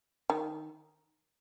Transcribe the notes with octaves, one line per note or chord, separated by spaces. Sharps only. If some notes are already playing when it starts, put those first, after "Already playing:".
D#3